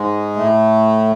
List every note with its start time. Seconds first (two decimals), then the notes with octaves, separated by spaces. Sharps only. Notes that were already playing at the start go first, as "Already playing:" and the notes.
Already playing: G#2 G#3
0.36 A2 A3